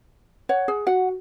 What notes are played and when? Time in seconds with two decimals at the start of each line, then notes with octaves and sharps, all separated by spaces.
0.49 C#5 F#5
0.68 G#4
0.87 F#4 F#5